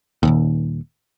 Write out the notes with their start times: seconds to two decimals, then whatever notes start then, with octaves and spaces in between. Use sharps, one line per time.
0.23 D#1 G#1 D#2